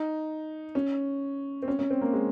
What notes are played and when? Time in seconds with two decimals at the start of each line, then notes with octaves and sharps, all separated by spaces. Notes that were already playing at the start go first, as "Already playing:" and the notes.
Already playing: D#4
0.75 C#4
1.62 C4
1.68 C#4
1.79 C#4
1.90 C4
2.01 A#3
2.13 G#3